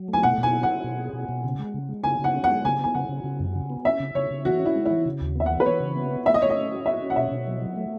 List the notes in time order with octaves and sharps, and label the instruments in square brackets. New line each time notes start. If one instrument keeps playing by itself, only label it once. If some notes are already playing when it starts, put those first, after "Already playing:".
Already playing: [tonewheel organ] F#3
A3
[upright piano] G#5
[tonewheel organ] B2 [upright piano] F#5
[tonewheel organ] B2
[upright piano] G#5
[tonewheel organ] E4
[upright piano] F#5
[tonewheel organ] E4
B2
G#4
B2
B2
C#3
G#3
C#3
G#3
[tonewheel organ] C#3 [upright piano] G#5
[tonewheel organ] C#3 [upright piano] F#5
[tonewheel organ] C#4
[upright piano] F#5
[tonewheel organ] G#3
[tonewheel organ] C#3 [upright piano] G#5
[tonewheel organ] B3 [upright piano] G#5
[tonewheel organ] C#3 [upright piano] F#5
[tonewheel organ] C#3
C#3
F#2
C#3
B3
[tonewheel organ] C#4 [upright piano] E5
[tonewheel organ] C#3
[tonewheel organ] C#3 [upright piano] C#5
[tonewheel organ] C#3
[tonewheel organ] E3 [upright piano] F#4
[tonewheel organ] C#4
[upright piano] E4
[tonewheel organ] G#3
[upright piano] E4
[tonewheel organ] E3
C#3
D#2
[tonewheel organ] B3 [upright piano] E5
[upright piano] F#5
[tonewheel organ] E3
[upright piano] B4
[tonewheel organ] E3 [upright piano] C#5
[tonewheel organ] C#3
B3
B3
[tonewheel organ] A3 [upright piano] E5
[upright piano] D#5
[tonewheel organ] A3 [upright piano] C#5
[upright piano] D#5
[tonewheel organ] C#4
F#4
[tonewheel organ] F#4 [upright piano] E5
[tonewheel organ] C#4
[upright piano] F#5
[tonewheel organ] B2 [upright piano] E5
[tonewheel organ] B2
F#3
F#3
A3